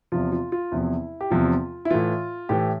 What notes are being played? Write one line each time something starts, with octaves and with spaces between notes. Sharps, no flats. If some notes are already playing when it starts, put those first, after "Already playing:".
E2 C3 F3 F4
F4
F4
E2 C3 F3 E4
G4
E2 C3 F3 F4
E4
A2 E3 F4
A2 E3 G4